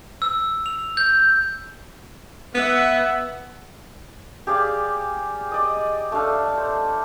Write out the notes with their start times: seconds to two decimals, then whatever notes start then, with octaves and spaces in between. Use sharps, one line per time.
0.22 E6
0.66 F7
0.97 G6
2.55 B3 E5 F#5
4.47 G4 G#4 D5 F5
5.51 D5 D#5
6.12 A3 D4 A4 F5
6.58 C5